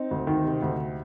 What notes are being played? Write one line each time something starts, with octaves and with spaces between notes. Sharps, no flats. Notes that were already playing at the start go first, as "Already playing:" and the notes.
Already playing: C4 D#4
D2
D#3
C3
D2